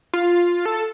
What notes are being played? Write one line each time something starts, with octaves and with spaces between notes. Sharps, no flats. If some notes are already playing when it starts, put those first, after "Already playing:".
F4
A4